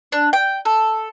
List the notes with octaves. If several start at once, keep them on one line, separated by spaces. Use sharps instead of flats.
D4
G5
A4